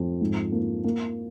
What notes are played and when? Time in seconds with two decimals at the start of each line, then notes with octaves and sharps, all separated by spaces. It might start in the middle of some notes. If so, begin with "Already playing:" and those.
Already playing: F2
0.21 G#2
0.52 A#3
0.84 A#3